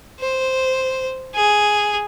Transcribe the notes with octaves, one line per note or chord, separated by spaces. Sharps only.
C5
G#4